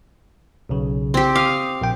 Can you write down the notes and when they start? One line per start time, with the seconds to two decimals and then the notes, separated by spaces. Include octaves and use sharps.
0.69 B1 C#3
1.14 C4 G4
1.36 F5 D6 D#6
1.81 A#1 G5